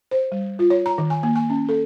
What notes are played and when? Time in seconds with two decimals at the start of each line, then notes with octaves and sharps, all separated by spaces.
0.11 C5
0.32 G3
0.59 F4
0.70 C#5
0.86 A#5
0.98 D#3
1.10 G#5
1.23 A#3
1.36 G#5
1.50 C#4
1.69 A4